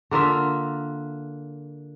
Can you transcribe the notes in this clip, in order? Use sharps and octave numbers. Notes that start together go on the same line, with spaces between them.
D3 A#3 F4 E5